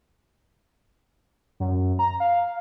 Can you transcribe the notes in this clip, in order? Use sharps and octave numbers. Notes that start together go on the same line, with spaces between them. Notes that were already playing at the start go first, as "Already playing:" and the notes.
F#2
A#5
F5